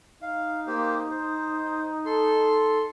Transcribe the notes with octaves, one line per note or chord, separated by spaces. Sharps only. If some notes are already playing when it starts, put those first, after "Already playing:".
D#4 F5
A#3 G4 C5
C5
A4 C6